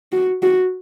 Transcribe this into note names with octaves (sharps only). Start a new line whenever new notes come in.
F#4
F#4